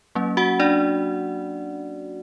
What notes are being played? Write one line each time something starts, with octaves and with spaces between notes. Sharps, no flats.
F#3 A#3 C#4
F#4 F#5
D4 D5